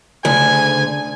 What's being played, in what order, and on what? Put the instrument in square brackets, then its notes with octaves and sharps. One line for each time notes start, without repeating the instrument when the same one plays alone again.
[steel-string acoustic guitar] D2 [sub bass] C#3 [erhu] G#5